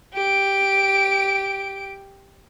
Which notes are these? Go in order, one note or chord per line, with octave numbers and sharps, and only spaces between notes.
G4 D7